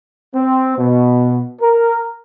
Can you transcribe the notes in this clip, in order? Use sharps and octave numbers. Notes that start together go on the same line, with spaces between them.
C4
B2
A#4